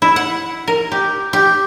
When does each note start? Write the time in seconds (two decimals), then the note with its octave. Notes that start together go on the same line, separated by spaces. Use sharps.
0.02 E4
0.16 F#5
0.68 A#4
0.92 G4
1.33 G4